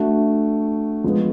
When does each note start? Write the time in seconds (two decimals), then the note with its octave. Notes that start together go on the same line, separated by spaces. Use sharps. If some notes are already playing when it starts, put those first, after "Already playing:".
Already playing: A3 D4 F#4
1.04 F3 G#3 B3